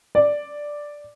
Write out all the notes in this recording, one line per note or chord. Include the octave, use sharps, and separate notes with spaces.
D5